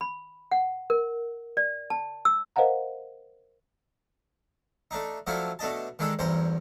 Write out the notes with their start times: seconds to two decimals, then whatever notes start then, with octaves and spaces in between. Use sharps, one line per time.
0.01 B5
0.52 F#5
0.90 A#4
1.57 D5
1.90 A5
2.25 E6
2.56 A#4 C5 D#5 F5 F#5 A#5
4.91 A3 D4 D#4
5.27 F3 F#3 A3 D4 E4 F4
5.59 B2 A3 D4 D#5 A5
5.99 D#3 G#3 D4 D#4 A4
6.19 B1 E2 G2 C5 A#5